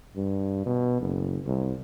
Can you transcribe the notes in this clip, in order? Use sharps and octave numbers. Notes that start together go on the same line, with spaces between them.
G2
B2
F#1
C2